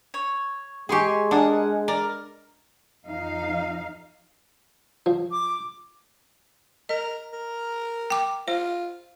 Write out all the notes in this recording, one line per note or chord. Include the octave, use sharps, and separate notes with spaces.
C#5
G#3 G4 G#4 G#5 C6 C#6
D4 G#4 A#4 F#5
A#4 D5
F2 D#4 F5
F3
D6
A#4 D#5
A#4
G5 D6
F4 C5